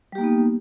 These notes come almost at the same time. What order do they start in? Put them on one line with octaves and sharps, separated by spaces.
G3 G4 A#3 D#4 B3